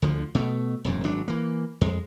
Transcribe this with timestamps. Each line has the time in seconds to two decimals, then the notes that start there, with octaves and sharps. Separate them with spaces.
0.02 D2 D3 F3
0.35 B2 A3
0.85 E1 F#2 A#2
1.04 G#1 F#3 D4
1.28 E3 A#3
1.81 F2 G#3